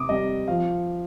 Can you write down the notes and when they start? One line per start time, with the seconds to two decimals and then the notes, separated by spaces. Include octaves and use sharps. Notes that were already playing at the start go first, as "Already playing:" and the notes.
Already playing: C3 D6 D#6
0.09 G3 C4 D#5
0.48 F3 F5